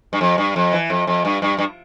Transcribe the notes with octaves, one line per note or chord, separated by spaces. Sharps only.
G2
F2
G2
F2
E3
F2
F2
G2
G2
G2